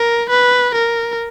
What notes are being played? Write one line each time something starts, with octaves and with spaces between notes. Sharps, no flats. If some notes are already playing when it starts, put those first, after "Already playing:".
Already playing: A#4
B4
A#4